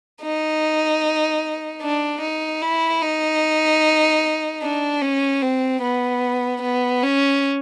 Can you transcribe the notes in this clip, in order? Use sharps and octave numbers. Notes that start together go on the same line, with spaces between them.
D#4
D4
D#4
E4
D#4
D4
C#4
C4
B3
B3
C#4